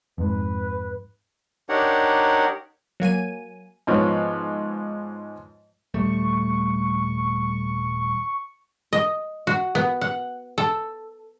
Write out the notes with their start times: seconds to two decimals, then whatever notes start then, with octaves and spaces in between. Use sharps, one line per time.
0.18 F2 G#2 B4
1.69 D4 D#4 G4 A#4 C#5 F#5
3.00 F#3 A#3 G#5 D#7
3.87 G#2 F3 B3 C#5
5.94 D#1 G3 A3 C#6
8.93 D#5
9.47 F#4
9.75 B3
10.01 F#5
10.58 A4